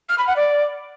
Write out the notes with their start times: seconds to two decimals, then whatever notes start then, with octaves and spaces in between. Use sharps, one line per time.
0.09 F6
0.18 B5
0.27 F#5
0.36 D5